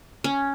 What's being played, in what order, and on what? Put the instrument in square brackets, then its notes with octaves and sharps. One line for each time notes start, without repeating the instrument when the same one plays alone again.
[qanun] C#4